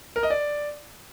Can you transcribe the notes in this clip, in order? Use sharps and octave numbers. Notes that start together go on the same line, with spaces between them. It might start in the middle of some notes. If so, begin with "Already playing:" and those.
A#4
D#5
D5